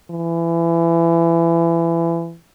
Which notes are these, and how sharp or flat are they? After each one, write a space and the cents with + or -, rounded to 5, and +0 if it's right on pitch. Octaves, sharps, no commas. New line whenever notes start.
E3 +25